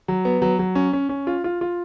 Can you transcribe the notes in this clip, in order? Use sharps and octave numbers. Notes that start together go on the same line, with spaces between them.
F#3
B3
F#3
F#3
C#4
C#4
C#4
F4
F4
F4